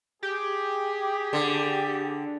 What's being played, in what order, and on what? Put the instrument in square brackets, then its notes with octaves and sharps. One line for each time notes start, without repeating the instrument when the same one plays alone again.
[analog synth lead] G4 [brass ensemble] G#4
[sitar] D3